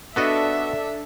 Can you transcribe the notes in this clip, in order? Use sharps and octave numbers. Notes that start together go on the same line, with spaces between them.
B3 D4 F#4 A4 D#5 E5